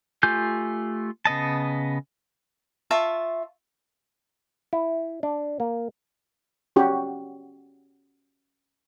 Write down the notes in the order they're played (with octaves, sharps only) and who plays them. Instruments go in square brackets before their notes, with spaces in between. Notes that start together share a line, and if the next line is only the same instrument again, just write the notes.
[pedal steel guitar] A3 F4 G4 G#5 G6
C#3 B3 D#5 A5
[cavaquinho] F4 E5 A5 C#6
[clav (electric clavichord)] E4
D4
A#3
[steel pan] C#4 F#4 G4